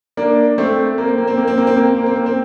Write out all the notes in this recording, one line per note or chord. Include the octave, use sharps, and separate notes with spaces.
A#3 D4
A3 C4
A#3
C4
A#3
C4
A#3
C4
A#3
C4
A#3
C4
A#3
C4
A#3
C4